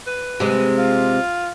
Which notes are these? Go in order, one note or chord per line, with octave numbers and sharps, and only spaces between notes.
B4
C3 G#3
F4